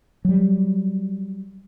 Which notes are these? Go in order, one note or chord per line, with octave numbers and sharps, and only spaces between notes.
F#3 G3